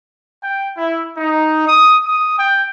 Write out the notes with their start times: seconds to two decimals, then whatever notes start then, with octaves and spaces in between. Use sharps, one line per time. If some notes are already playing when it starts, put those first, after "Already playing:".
0.42 G5
0.77 E4
1.18 D#4
1.68 D#6
2.06 D#6
2.38 G5